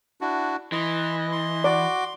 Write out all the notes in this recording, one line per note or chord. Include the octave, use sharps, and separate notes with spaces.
D4 E4 F#4
E3 D#5 C6
C6
F#4 D5 D6